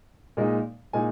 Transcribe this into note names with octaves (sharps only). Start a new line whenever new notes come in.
A#2 G#3 D#4
A#2 G#3 D#4 G#5